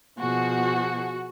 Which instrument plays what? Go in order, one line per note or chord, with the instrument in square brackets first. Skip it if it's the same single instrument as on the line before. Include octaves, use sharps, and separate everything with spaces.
[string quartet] B2 F3 G#4 [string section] F#4